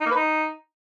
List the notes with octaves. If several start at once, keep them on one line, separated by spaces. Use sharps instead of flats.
D#4
A#3
B4
D#4